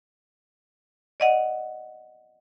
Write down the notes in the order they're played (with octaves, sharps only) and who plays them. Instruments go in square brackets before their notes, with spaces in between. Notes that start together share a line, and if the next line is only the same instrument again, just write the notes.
[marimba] D5 D#5 F#5